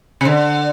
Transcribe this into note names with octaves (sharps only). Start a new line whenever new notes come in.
C3
D3